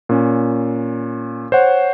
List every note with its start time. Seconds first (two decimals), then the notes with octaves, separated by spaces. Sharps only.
0.09 A#2 C#4
1.52 C5 C#5 F#5